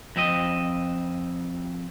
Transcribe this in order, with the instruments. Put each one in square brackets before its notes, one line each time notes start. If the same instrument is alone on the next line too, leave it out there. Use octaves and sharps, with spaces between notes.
[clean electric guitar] F2 C4 D#5